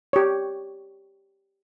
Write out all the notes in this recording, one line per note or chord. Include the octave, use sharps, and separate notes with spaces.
G4 C#5